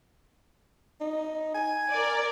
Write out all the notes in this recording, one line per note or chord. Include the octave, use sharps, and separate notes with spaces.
D#4
G#5
A#4 D5